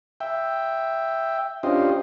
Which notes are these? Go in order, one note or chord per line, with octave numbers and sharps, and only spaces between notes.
E5 G5
C#4 D4 F4 G4 C5 D#5